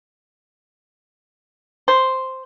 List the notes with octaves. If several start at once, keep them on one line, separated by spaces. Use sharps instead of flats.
C5